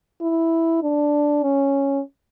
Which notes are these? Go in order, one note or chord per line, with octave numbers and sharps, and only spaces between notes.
E4
D4
C#4